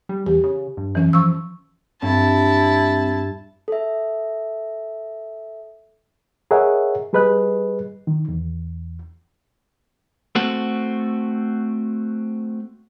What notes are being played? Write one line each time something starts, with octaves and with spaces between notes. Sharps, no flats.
G3
E2 G4
C#3
G2
F#2 E3 C#4
F3 C#6 E6
G2 C4 E4 A5
A4 E5
G#4 A#4 C#5 D#5 E5 F#5
G3 G#4 B4 D#5 F#6
D#3
E2
A3 C4 F#4